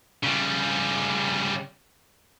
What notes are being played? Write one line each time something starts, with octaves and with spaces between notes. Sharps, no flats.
C#3 G3